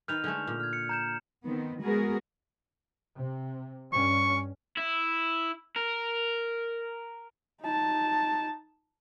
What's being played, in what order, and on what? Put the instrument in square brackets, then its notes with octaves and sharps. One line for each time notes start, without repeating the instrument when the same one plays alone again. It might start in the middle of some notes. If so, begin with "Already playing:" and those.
[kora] D#3 B4 [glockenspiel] F6 G6 F7
[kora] D3 G#3 A3
A#2
[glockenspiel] F6 G#6
C#7
A#5 G6 E7
[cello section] D#3 B3 C4
G#3 B3 F#4 G#4 A#4
[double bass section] C3
[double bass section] G2 C#4 [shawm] C#6
[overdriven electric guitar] E4
A#4
[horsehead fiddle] D#4 A5